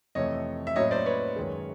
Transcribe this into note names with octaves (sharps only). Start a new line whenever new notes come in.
F2 C3 E3 A3 C#5 D#5
E5
A2 F#3 A#3 C#4 C#5 D#5
C5 D5
B4 C#5
F#2 D#3 G#3